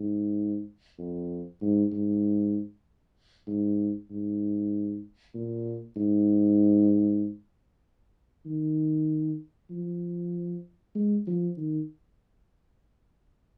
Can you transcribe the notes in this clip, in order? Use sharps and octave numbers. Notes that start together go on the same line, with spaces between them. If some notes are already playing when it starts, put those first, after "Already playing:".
Already playing: G#2
F2
G#2
G#2
G#2
G#2
A#2
G#2
D#3
F3
G#3
F3
D#3